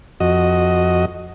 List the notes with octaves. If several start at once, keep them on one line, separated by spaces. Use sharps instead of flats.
F2 F#4 D#5